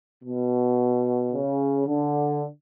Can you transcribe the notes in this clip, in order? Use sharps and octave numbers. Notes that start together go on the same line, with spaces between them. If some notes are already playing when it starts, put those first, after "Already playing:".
B2
C#3
D3